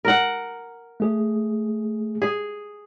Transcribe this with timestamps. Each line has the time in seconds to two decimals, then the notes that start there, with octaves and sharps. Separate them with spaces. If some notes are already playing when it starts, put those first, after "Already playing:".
0.05 A#4 F#5
1.00 A3 G#4
2.22 G#4